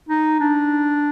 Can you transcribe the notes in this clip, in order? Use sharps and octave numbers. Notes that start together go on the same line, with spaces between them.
D#4
D4